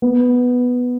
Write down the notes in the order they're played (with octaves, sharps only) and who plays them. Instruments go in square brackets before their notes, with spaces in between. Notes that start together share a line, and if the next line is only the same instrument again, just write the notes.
[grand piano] B3